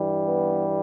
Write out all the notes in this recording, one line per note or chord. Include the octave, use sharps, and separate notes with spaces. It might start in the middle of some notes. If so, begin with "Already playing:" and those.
Already playing: G2 E3 G3
B3